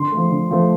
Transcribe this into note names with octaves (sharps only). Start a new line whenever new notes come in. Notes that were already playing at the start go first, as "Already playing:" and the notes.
Already playing: D3 C6
F3 A3
D3
F3 A3